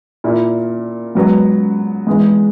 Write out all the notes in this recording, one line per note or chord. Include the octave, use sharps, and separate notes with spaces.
A#2 A#3 E4
G#2 F#3 B3
G#2 E3 G#3 B3